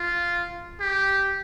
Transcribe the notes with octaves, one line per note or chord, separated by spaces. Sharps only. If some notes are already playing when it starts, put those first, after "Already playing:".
Already playing: F4
G4